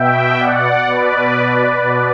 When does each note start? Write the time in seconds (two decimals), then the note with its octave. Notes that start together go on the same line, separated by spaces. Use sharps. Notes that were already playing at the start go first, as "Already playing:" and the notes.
Already playing: B2 E5 G5
0.39 D5 F#5
0.87 B2 B4 D5
1.82 B2